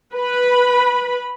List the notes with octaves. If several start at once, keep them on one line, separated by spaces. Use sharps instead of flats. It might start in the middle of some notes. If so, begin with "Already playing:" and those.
B4 B5